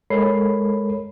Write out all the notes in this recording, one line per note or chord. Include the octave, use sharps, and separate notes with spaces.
G#3 A4 A#4 C#5 B5 C7